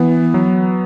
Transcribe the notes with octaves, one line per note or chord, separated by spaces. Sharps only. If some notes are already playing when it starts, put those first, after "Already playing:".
Already playing: E3 B3
F#3